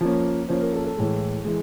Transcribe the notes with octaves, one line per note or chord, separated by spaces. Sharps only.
F3 A#3 C#4
F3 A#3 C#4 C5
A#4
A4
A4
A2 E3 G#3
E3 G#3